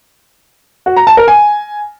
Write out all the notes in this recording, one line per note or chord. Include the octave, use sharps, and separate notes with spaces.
F#4
A#5
A5
A#4
G#5